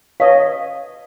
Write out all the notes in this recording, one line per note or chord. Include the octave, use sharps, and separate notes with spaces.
B4 C#5 D#5 F5